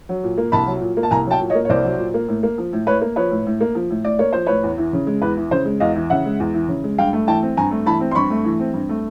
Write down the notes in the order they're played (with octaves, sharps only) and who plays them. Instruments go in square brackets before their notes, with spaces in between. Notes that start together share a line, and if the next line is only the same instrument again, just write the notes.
[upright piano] F#3
A#2
A#3
C2 A5 B5
F#3
A#2
A#3
A5
C2 G#5 A#5
F#3 G5 A5
A#2
C#5 D#5
A#3
C#5
C2 C5 D5
F#3
A#2
A#3
A2
A#3
F3
A2
A2 B4 C#5
A#3
F3 B4 C#5
A2
A2
A#3
F3
A2
A2 D5
A#3 C#5
F3 C5
A2 B4 C#5
E2
E3
C#3
G#3
E2 B4
E3
C#3 C5
G#3
E2 D#5 F5
E3
C#3 E5 F#5
G#3
E2
E3
C#3
G#3
G2 F5 G5
A3
E3 G5 A5
C4
G2 G#5 A#5
A3
E3 A5 B5
C4
C6
G2 B5 C#6
A3
E3
C4
G2
A3